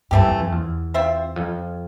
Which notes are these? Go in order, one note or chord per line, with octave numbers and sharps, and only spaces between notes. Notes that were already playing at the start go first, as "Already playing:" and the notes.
G2 E3 A3 C4 G4
G2
F2
E2
C4 F4 C5 E5
F2